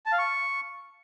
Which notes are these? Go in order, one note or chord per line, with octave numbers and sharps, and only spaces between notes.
A5
F5
C#6